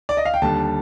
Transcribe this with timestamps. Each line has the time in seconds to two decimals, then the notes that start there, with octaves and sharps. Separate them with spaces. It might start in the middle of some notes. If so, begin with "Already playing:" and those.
0.09 D5
0.17 D#5
0.25 F5
0.34 G5
0.42 D#2 D3 G3 A5